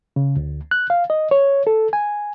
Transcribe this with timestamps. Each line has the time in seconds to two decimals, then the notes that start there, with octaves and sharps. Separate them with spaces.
0.16 C#3
0.36 D2
0.71 F#6
0.90 F5
1.10 D#5
1.31 C#5
1.67 A4
1.93 G#5